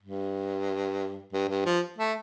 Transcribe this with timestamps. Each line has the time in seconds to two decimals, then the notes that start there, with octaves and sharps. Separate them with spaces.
0.02 G2
1.33 G2
1.49 G2
1.65 F3
1.98 A3